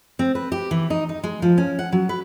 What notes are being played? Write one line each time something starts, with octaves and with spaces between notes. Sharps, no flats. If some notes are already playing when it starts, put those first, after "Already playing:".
C4
B4
G4
E3
D#4
D#4
G#3
F3
C#4
F#5
F#3
B4